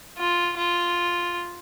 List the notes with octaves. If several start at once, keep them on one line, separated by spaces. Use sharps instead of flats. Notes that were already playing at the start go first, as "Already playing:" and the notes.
F4
F4